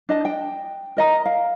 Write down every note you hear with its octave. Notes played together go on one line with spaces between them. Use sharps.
D4 D#5 A5
G5
A#4 D#5 A#5
F5